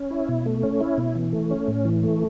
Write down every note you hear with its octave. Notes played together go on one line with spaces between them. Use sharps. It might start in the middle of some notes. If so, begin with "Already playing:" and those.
Already playing: C#4
E4
B2
A3
C#4
E4
B2
E3
A3
C#4
A2
E3
A3